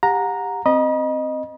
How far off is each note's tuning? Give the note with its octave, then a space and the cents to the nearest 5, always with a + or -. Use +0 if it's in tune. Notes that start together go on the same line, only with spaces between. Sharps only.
G4 +20 F#5 -30 A#5 +0
C4 +0 D#5 -10 B5 -45